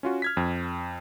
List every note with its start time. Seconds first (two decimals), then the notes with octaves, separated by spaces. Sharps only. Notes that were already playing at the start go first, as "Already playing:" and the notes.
0.03 C#4 F4 F#4
0.22 F6 G#6 B6
0.37 F2